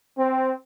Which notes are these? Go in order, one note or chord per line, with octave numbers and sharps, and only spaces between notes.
C4